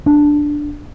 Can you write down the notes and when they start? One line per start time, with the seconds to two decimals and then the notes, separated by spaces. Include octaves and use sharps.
0.06 D4